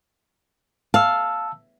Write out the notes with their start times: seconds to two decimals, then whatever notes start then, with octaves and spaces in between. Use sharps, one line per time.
0.94 F5 A5 E6